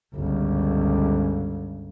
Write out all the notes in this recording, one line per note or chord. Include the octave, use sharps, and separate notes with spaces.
G1 C#2